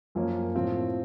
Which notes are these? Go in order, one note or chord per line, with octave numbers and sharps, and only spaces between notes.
F#2 F3 A#3 C#4
A2 F3 C4 F4